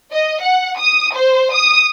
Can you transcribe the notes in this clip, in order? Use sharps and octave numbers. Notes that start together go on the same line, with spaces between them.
D#5
F#5
D#6
C5
D#6